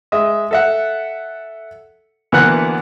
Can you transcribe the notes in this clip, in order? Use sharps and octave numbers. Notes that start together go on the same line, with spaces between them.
G#3 E5 D#6
A4 E5 F#5
D2 E3 A#3 B3 F#5 F#6